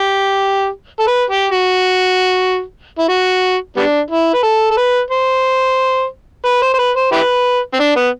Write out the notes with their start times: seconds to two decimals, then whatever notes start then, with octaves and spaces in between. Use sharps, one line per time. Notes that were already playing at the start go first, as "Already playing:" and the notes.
Already playing: G4
1.00 A4
1.07 B4
1.30 G4
1.52 F#4
2.99 E4
3.09 F#4
3.77 G3 B3 D4
4.10 E4
4.33 B4
4.43 A4
4.71 A4
4.77 B4
5.11 C5
6.45 B4
6.62 C5
6.74 C5
6.79 B4
6.96 C5
7.12 E4 G4 B4
7.74 C4
7.79 D4
7.96 B3